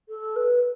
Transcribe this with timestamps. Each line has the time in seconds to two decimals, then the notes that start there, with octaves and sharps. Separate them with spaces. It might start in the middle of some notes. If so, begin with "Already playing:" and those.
0.09 A4
0.36 B4